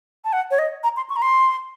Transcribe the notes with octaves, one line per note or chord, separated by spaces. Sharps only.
A5
F#5
C#5
D#5
A#5
C6
C#6
A#5
C6